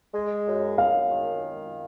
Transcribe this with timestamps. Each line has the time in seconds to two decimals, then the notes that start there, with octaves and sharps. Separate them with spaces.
0.14 G#3
0.47 F#2
0.78 F#2 F5
1.10 D#3